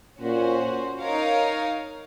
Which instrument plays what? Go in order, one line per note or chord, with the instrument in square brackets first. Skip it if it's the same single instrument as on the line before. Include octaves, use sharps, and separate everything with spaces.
[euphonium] A#2 [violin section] C#4 F#4 C5
[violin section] D#4 A#4 C#5 F5